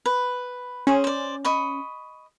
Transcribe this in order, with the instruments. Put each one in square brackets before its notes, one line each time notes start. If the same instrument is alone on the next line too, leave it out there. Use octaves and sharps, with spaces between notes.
[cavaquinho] B4
[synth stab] C#4 [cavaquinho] G#4 C5
[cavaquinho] C5 D5
D#5 B5 C#6